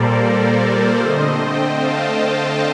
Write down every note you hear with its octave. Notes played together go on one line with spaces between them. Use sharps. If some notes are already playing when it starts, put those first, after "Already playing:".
Already playing: A#2 G3 A#3 A4 A#4 C5 D5
A#4 D5
D3 A3 C4 C5 D#5
D#5 G5
F5 A5